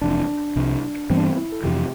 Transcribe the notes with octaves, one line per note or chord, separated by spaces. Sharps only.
F1 F2 E3 D4
C2 C3 F3
G2 E3 G3 B3 C4
D4
C4
E4
A4
F2 C3 E3 G4